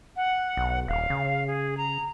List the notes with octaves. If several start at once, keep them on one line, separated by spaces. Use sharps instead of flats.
F#5
B1
D#1 F5
C#3
G#4
A#5